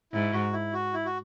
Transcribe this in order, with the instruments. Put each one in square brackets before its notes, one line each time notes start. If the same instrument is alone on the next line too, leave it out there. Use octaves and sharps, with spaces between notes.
[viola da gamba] G#2 [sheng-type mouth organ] E4
[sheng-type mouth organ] F#4
E4
F#4
E4
F#4